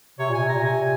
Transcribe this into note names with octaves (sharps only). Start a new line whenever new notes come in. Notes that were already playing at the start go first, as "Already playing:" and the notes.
C3 C#5
A#2
G#5
C3
A#2 A#5
C3 G#5